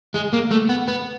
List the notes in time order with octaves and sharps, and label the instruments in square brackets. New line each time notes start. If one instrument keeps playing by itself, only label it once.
[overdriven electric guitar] G#3
A#3
A3
B3
B3